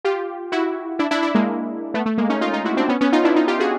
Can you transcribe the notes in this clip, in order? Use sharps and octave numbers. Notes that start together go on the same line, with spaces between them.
F4 G4
E4 F#4
D4 E4
D4 E4
D4 E4
G#3 A#3
A3 B3
A3
G#3 A#3
C#4 D#4
D#4 F4
D#4 F4
E4 F#4
C4 D4
B3 C#4
B3 C#4
D#4 F4
D4 E4
D#4 F4
F4 G4
F#4 G#4